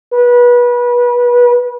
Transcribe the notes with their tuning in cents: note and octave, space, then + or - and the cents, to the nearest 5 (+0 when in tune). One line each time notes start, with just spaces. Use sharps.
B4 -25